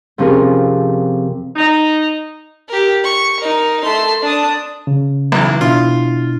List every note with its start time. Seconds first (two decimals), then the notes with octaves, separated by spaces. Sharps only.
0.18 F2 C3 F3 C#4 G#4 A#4
1.56 D#4
2.68 G4 A#4
3.04 C#6
3.40 D#4 A#4
3.84 A3 C6
4.22 D4 D#6
4.87 C#3
5.32 B1 E3
5.61 B2 D4 E4 F4